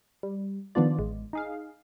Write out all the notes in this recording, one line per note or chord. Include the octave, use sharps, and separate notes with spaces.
G3
D#3 F3 B3 D4 F4 D5
A1 G#3
D#4 G#4 F5